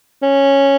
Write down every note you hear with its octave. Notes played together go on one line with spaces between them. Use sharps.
C#4